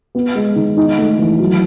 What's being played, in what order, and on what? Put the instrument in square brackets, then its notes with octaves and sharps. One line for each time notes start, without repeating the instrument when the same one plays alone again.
[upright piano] B3
G#3
D#3
D#4
A3
E3
F#3